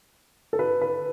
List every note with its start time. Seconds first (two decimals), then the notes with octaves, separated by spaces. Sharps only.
0.53 A4
0.59 B4
0.81 B4